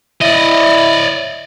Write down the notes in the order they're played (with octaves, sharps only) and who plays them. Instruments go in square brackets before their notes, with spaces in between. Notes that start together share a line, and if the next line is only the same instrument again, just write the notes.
[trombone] E4 [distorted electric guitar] D5 D#5